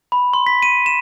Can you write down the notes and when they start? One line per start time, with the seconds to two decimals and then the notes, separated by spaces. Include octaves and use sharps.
0.12 B5
0.33 C6
0.47 B6
0.62 D#7
0.86 E7